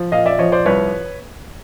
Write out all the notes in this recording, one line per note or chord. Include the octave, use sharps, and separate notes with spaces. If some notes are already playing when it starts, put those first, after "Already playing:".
Already playing: F3
A#2 D#5 F5
D5 E5
F3 C#5 D#5
C5 D5
C2 B4 C#5